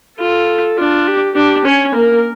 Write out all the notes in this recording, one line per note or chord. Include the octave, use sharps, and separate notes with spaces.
F4 A4
D4 F4
G4
D4 G4
C#4 C#5
A#3 A#4